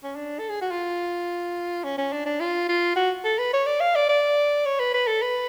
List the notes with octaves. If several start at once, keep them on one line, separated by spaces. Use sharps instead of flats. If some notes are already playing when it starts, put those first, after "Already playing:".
C#4
D4
A4
G#4
F#4
F4
C#4
C#4
D4
D4
F4
F4
F#4
A4
B4
C#5
D5
F5
D5
D5
C#5
B4
B4
A4
B4